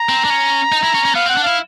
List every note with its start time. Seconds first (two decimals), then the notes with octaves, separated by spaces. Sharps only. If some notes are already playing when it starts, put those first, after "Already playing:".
Already playing: A#5
0.09 C4
0.24 D4
0.30 C#4
0.72 D#4
0.83 E4
0.94 C#4
1.05 C#4
1.15 B3 F5
1.26 C4
1.29 F#5
1.37 D4
1.43 E4 F5